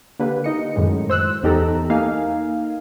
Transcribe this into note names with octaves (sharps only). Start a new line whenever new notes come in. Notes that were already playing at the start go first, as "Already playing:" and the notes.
D3 A#3 G4 B4
D#4 D#5 C#7
F#2 A2 D#3 G#3
C5 E6 F#6
E2 D#4 G4 A4 A#5
A#3 D#4 F5 G#5